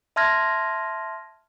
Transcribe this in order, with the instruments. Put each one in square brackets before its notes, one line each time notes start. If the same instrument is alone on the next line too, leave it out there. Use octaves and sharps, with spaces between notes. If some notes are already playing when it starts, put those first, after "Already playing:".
[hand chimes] E5 A5 C6 F6 G#6 A#6